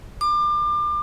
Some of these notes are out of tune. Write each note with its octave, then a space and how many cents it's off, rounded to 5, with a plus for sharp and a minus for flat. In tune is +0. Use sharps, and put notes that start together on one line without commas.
D6 +30